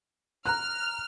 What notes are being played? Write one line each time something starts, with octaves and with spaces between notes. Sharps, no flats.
A#5 F6 F#6